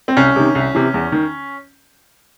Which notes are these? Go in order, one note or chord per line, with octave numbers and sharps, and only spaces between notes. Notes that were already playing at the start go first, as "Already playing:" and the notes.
C4
C2 C#4
C3 D#3
C2
C3 E3
E2
D#3